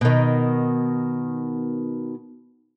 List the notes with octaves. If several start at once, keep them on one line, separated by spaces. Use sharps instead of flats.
B2 D#3